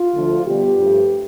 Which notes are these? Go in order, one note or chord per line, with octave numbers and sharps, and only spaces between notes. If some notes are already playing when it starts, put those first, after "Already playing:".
Already playing: F4
D2 D3 F3 A3
B2 G3 G4
G2 F3 A3